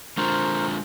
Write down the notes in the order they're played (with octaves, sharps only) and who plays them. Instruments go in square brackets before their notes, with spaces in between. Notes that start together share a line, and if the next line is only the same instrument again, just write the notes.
[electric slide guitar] G#3 D4 F4 [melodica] A#4 C5 C#6